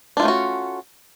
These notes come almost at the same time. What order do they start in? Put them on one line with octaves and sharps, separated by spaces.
D4 F4 A3 C#4 F#4